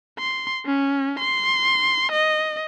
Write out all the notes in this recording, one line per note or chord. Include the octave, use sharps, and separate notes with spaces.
C6
C#4
C6
D#5